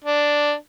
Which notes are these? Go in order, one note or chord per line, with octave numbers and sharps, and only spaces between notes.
D4